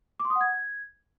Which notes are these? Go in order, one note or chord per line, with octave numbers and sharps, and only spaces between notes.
D6
C6
D#6
F#5
G#6